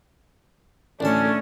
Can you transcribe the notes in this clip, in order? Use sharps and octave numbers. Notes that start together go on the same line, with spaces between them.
A1 D2 A3 C#4 D4 A5